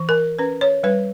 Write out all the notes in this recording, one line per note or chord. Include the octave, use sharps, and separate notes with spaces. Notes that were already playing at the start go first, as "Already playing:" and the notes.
Already playing: E3
A#4
C#4 B4
C#5
G3 B4